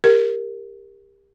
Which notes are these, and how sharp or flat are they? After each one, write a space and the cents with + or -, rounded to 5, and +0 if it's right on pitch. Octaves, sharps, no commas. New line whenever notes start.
G4 +25 A#4 +0